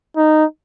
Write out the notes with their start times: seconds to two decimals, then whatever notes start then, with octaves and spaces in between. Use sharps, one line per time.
0.17 D#4